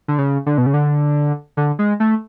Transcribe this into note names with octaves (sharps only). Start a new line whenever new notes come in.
D3
C#3
D3
B2
C#3
D3
D3
G#3
A3